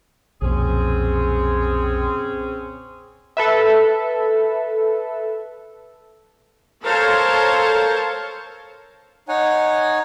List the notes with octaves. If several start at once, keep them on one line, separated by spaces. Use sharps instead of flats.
B1 F2 A#2 C4 C#4 G#4
A4 B4 E5
A4 A#4 C5 C#5 F5 A5
D#4 C#5 F#5 G#5